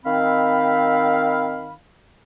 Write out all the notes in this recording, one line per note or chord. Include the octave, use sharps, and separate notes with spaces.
D#3 C4 F5 B5